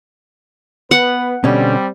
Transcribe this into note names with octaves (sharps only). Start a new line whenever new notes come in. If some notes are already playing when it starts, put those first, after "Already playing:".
B3 B4 F#5
B2 D3 G3 C4 C#4